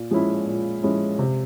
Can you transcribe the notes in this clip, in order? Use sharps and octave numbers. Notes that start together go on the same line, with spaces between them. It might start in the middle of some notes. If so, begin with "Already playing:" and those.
Already playing: A#2
F3 G#3 C#4 E4
A#2
F3 G#3 C#4 E4
C3